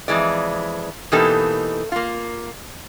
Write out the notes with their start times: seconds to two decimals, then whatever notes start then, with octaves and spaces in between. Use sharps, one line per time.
0.08 F2 C#3 E3 G#3 D5
1.12 B2 E3 A#3 D#4 G4 A4
1.92 A#3 F4